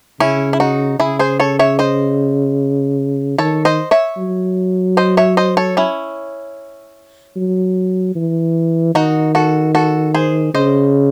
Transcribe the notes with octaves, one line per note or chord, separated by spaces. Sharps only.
C#3 C#4 E4
E4
D#4 F#4
C#3 E4 G#4
G#4 C5
A4 C#5
C#5 E5
C5 D#5
D#3 A4 C#5
C5 D#5
C#5 E5
F#3
C5 D#5
C#5 E5
C5 D#5
A4 C#5
C#4 E4
F#3
E3
D#3 D#4 F#4
F#4 A4
F#4 A4
G#4 C5
C#3 C5 D#5